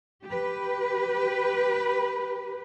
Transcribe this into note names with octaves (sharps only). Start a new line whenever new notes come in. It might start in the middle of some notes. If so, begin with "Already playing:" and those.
G4 B4